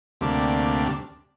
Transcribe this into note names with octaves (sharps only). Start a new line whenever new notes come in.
D2 C3 G3 A#3 D4